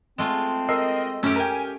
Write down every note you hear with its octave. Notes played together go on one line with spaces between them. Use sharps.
G#3 A3 C4 F4
A#4 D#5 E6 C7
F#2 A3 C#4 G4 E6
A#4 G5 G#5